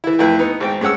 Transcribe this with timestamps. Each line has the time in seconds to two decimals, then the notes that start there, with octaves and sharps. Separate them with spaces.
0.04 E3 E4
0.19 F2 A3 E4 B4
0.39 B3 D#4
0.60 G#1 G#2 C5 G5
0.81 G2 G#3 C#4 F#5 E6